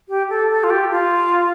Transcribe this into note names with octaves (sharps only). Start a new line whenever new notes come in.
G4
A4
A4
F4
G4
F4